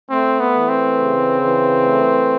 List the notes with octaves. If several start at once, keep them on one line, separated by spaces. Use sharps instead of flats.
A3 C4
B3
E3
C4
C#3
E3
A3